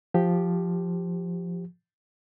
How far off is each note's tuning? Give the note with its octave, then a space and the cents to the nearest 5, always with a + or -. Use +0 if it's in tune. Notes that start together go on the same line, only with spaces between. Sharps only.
F3 +0 G4 +0